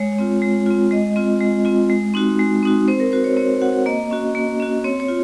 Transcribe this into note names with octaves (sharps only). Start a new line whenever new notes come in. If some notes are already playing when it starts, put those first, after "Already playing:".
Already playing: G#3 C#5
C4 F4
G#3
C4 F4
G#3 D#5
C4 F4
G#3
C4 F4
G#3
C4 D#4 F#4
G#3
C4 D#4 F#4
C4 C5
A#4
F#4 C5
C#5
C4 C#5
F#4 F#5
A#3 D#5
C#4 F#4
A#3
C#4 F#4
C4 C#5
C#5
F4